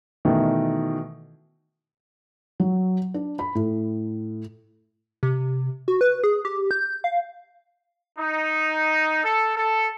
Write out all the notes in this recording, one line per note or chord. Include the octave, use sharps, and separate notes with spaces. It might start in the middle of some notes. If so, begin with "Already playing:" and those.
B2 D#3 E3 A3
F#3
D4
B5
A2
C3
F#4
B4
G#4
G4
G6
F5
D#4
A4
A4